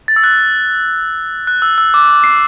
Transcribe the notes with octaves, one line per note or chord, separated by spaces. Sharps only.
A6
E6
F#6
F#6
E6
E6
D6
D6
C7